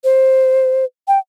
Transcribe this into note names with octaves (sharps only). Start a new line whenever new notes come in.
C5
G5